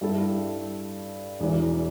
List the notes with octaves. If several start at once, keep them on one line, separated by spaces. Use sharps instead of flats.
G2 G3 E4 A4
E1 E2 E3